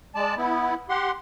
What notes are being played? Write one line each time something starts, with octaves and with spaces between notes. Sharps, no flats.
G#3 D5 A5
B3 E4
G4 F#5 C6